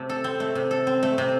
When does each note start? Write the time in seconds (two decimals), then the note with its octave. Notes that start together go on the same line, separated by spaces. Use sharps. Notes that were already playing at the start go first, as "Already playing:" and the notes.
Already playing: C3 A3
0.09 A4
0.24 C4
0.40 A3
0.55 C3
0.71 A4
0.87 C4
1.03 A3
1.18 C3